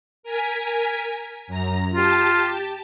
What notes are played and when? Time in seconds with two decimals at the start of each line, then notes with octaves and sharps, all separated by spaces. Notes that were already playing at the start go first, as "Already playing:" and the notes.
0.23 A#4 G#5 B6
1.48 F#2 A#5
1.93 F4 G4 A5